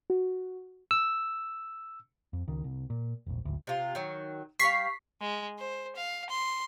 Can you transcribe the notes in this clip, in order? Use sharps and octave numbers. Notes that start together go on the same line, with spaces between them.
F#4
E6
F2
C#2 D#3
C2
A#2
E1 A#1
D1 G#1 D2
C3 F4
D#3 F#3
G3 F5 C#6 B6 C7
G#3
C5
F5
C6